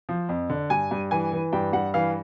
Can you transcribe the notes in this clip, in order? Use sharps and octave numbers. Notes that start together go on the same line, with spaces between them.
F3
F2
D3
G2 G#5
G2
E3 G#5
E3
G2 G5
G2 F#5
E3 F5